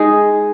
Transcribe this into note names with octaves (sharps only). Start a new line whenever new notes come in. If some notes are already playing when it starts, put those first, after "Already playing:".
Already playing: G#3 D#4 G#4